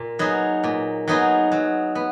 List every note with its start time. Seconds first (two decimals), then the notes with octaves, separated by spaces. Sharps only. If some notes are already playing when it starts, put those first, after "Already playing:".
Already playing: A#2
0.19 F#3 B3 D#4 G#4
0.64 A#2
1.08 F#3 B3 D#4 G#4
1.52 F#3
1.95 B3